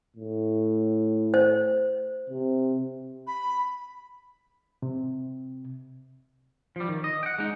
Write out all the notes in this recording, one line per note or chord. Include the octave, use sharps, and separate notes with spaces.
A2
C5
C3
B5
C3
F3 G3
D#3
D#5
F#5 G5
G#3 D#4